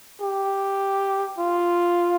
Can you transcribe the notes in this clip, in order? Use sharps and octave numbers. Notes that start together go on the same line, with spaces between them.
G4
F4